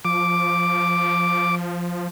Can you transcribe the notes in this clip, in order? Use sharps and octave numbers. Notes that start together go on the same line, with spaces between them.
F3 D6